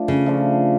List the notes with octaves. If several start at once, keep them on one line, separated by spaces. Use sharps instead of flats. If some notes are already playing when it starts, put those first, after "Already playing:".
Already playing: F3 A3 D4 F4
C#3
F3 A3 D4 F4